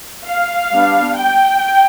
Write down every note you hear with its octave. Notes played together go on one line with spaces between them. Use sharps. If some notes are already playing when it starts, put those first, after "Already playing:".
F5
G3 B3 D4
G5